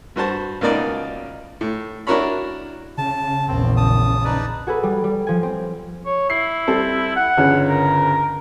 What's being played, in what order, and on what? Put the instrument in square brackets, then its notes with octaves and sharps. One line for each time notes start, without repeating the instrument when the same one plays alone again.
[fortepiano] G2 F#4 C5 A5
C#2 B2 A#3 D#4 D5 D6
A2
D4 E4 F#4 A#4 C#5 B5
[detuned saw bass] C#3 [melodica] A5
[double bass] A#1 E2 [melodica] C4
[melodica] A5 D#6
D#4 B4 D5
[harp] F#4 G#4 A4 B4
G3
G3
F3 G#5
C4
[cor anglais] C#5
[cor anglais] E4 [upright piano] C7
[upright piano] G3 C4 A4
[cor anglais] F#5
[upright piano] G1 C#3 C#4
[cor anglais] A#4